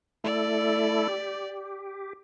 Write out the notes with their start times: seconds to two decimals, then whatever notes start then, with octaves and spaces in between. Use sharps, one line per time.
0.24 A3 E4 A4 D5
1.08 G4